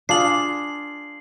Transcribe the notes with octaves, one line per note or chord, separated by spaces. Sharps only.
D4 F4 G#4 C7 F#7